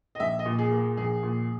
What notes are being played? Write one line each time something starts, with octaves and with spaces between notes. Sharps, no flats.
D#5
A#1 E5
D#5
A#2
G#4
A#3
G#4
A#1 G#4
A#2